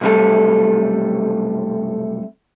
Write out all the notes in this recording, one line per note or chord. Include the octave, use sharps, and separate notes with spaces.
B1 F#2 C3 G3 A3 A4